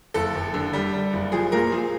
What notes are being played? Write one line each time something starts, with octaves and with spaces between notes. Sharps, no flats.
F#1 A4
F#1
D3
G3
G3
F#1
F3 G#4
A#2 A#4
F3 G#4